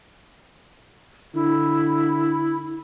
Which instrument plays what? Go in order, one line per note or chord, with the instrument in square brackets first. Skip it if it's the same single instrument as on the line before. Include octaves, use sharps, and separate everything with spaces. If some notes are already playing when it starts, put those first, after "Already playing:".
[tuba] D3 [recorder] E4